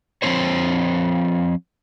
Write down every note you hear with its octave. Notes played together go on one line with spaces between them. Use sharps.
F3 F#3 C4 C5 C#5